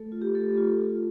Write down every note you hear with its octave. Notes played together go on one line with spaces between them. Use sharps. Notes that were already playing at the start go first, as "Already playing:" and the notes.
Already playing: A3 A4
F4
G4
A3 A4
F4
F4